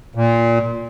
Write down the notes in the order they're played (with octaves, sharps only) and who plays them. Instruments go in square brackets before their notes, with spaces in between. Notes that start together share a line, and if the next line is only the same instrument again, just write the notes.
[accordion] A#2